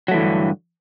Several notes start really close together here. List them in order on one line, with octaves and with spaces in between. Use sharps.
F#3 A3 E3 D3 G2